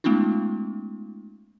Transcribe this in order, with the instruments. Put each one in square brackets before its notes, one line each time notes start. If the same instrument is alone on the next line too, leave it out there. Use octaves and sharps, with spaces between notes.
[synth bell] G#3 A3 B3 C#4 D#4 F4